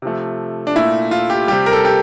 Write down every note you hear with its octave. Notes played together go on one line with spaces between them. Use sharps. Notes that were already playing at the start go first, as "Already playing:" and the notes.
C3 F3 A3
D4
A#2 A3 E4
F4
G4
C3 G3 G4
A#4
A4
G4